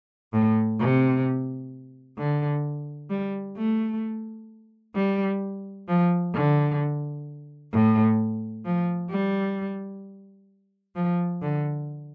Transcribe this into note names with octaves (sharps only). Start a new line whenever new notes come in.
A2
C3
D3
G3
A3
G3
F3
D3
A2
F3
G3
F3
D3